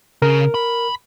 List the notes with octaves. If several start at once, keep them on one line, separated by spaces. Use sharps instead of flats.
C#3 A#4
B5